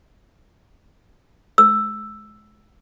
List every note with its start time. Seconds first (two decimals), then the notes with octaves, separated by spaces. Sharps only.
1.58 E6